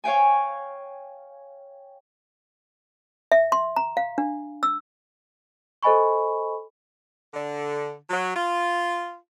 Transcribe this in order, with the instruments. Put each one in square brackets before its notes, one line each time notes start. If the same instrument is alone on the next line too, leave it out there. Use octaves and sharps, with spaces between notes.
[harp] C#5 F5 G5 G#5
[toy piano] E5
C6
A#5
F5
D4
E6
[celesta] A4 C5 D#5 G#5 B5 C#6
[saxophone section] D3
F#3
F4